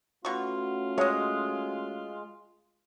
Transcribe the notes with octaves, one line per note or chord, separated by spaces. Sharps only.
B2 A3 C#4 F4 F#4 C#6
G#3 C#5 D#5